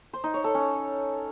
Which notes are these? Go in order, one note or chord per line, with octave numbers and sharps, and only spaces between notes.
C5
D#4
C#5
A4
C#4